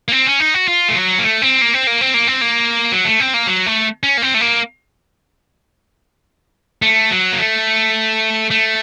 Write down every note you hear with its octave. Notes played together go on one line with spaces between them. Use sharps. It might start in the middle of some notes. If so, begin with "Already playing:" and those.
A#3
C4
C#4
D#4
F#4
F4
A3
F#3
A#3
A3
C4
A#3
C4
A#3
C4
A#3
C4
A#3
F#3
A3
C4
A#3
F#3
A3
C#4
A#3
C4
A3
A#3
A3
F#3
A#3
A3
A3